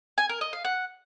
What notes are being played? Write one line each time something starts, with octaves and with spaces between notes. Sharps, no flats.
G#5
A#4
D#5
F5
F#5